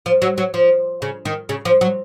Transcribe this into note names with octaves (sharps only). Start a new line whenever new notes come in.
F3
F#3
F#3
F3
C#3
D#3
C#3
F3
F#3